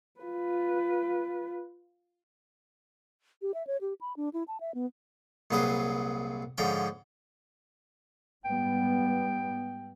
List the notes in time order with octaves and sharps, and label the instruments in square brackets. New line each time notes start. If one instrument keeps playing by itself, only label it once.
[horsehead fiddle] F4 B4
[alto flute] G4
E5
C#5
G4
B5
D4
E4
A5
E5
B3
[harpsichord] C2 A#2 F#3 G#4 B4 C5
G#2 D3 F3 C#4 G5
[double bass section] G#2 G3 B3 [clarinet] G5